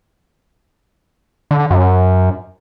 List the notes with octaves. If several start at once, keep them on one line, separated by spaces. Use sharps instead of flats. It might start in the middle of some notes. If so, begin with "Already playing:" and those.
D3
F#2